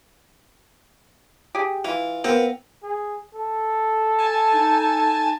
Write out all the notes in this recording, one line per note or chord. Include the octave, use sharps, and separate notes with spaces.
G4 G#4
E3 F4
B3 C4 F4 A#4
G#4
A4
G#5 A5
D#4